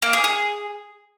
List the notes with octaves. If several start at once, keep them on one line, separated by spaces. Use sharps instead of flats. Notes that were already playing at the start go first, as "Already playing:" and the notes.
A#3
G#4
G#4